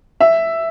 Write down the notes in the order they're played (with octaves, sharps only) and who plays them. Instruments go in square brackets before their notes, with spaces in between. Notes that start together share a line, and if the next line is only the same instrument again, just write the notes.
[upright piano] E5